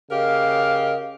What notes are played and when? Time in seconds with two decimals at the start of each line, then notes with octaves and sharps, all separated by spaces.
0.11 C#3 G4 A#4 D#5 F5